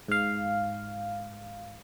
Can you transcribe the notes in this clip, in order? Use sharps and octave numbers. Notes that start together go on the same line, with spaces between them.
G#2 F5